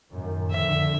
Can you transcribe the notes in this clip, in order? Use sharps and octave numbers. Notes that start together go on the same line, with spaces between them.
F#2 A2 D#3
F2 D3 E5